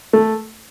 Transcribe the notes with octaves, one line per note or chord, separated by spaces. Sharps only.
A3